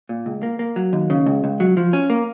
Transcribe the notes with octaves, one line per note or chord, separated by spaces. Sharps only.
A#2
C#2
A#3
A#3
F#3
D#2
C#3
C#2
C#2
F#3
F3
C#4
A#3